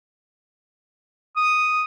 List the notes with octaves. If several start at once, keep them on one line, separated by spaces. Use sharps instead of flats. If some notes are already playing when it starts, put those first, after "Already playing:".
D#6